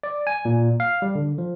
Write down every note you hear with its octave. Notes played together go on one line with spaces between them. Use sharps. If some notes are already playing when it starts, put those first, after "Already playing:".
D5
G#5
A#2
F5
G3
D3
F3